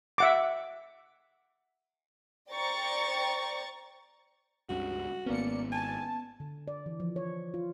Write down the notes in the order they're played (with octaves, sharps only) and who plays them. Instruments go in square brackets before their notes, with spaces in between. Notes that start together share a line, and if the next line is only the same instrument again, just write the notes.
[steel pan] E5 F#5 D6
[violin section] C5 D5 G5 A#5 C#6 A6
[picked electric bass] C#2 G2 C#3 [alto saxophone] F#4
[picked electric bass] G#1 C#4 [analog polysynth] A#3 D5 C#7 [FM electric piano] B3
[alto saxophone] G#5 [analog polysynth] A5
[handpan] D3
D5
E3
F3
C#5
F4